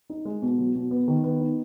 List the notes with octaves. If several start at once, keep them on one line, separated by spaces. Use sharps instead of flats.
D#4
G#3
B2
F#3
B2
B3
D#3
B3
D#4